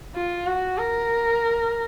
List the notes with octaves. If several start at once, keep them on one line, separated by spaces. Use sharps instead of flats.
F4
F#4
A#4